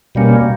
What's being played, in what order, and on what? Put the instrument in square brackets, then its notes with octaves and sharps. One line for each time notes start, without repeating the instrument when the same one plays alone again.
[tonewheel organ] B2 G3 A#3 C#4